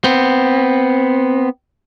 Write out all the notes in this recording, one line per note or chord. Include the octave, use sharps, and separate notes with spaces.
B3 C4